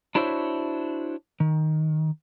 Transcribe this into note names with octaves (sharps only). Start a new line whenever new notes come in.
D4 E4 F#4 C5 C#5 E5
D#3